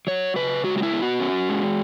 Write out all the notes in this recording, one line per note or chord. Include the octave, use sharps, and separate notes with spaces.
F#3 C#5
C#3 B4
G#3 F#4
F#4
E4
B3
F#4
C#4
G#3